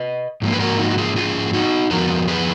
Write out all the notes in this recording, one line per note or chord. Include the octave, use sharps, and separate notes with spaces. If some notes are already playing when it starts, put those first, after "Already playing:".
Already playing: B4 D#5
G#2 F3 A#3
B4
F#4 A#4
D#4 F#4
F#4
F4 G#4
F4 G#4
D#4 F#4
F2 F3 B3 F#4 A#4
G#4 B4